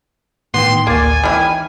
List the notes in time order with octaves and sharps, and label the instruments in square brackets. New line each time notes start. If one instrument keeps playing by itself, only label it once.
[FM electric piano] A2 D#3 G5 [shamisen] B3 [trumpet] C6
[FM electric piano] A1 D2 A6 [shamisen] A#3 [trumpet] G#5
[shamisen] D#3 E3 E4 [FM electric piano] G5 B5 F6